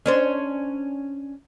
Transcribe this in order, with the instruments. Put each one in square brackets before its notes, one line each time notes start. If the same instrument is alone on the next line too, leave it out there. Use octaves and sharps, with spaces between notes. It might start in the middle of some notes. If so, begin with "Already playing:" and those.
[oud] C#4 D4 C5